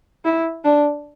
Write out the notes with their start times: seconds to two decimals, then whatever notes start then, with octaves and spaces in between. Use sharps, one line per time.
0.25 E4
0.64 D4